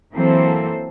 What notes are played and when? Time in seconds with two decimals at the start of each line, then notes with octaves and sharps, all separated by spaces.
0.15 E3 F#3 A#3 C4 A4 C5